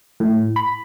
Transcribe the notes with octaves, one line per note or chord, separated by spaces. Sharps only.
A2
B5